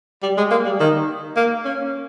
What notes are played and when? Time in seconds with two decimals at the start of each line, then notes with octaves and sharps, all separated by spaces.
0.23 G3
0.37 G#3
0.51 A#3
0.65 G3
0.80 D#3
1.36 A#3
1.65 C#4